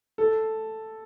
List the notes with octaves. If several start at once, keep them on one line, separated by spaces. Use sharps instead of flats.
A4